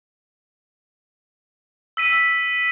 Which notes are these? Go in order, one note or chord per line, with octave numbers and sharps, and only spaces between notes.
E6 B6 D#7